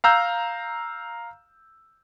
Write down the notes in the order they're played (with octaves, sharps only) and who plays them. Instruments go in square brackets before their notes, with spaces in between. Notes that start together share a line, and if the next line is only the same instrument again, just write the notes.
[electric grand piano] F5 A#5 E6 G6